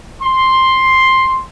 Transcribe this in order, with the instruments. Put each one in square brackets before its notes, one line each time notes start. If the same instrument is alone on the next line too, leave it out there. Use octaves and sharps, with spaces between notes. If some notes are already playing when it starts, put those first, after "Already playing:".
[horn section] C6